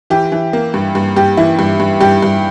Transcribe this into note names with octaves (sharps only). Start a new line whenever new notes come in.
E3 G4
E3
A#3
G2
G2
G2 G4
E3 E4
G2
G2
G2 G4
G2